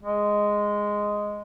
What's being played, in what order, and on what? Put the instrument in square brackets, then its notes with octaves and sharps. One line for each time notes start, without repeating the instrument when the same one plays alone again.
[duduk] G#3